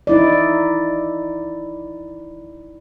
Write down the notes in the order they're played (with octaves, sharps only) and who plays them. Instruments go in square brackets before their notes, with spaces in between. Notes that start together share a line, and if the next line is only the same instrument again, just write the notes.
[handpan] D#4 E4 D5